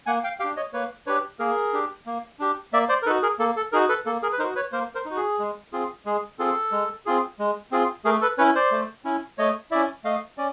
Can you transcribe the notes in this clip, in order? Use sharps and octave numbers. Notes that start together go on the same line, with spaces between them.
A#3 F#5 G#5
F5 G5
D4 G4 F5 G5
C#5 D#5
A#3 B4 C#5
D4 G4 B4 C#5
A#3 G#4 A#4
D4 G4
A#3
D4 G4
A#3 D5 E5
C5 D5
A#4
D#4 F#4 A4 B4
G#4 A#4
A#3 A4
A4
D#4 F#4 G#4 A#4
A4 B4
A#3 A4
G#4 A#4
B4
D#4 F#4 A#4 C5
B4 C#5
A#3 A#4 C5
A#4 C5
D#4
F#4
G#4
G#3
C4 F4 G#4
G#3 G#4
C4 F4 G#4 A4
G#3
C4 F4 G#4
G#3
C4 F4 G#4
A3 G#4 A#4
A4 B4
C#4 E4 B4 C#5
C5 D5
A3
C#4 E4
A3 C#5 D#5
C#4 E4 D5 E5
A3 D#5 F5
C#4 D5